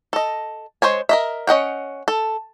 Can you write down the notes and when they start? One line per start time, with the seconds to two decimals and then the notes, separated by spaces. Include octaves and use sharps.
0.13 A4 D#5
0.82 G#3 C5 C#5 G#5
1.09 A#4 D#5 E5
1.47 C#4 D#5 F#5 G5
2.08 A4